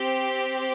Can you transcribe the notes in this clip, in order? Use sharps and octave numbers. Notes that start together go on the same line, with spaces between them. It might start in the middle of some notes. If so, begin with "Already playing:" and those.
Already playing: C4 G4